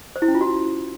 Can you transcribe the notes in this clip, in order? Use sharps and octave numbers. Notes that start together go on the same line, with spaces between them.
C5
E4
C#4
F4
F#4